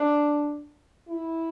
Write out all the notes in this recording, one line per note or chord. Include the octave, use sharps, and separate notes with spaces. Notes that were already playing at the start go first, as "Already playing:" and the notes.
Already playing: D4
E4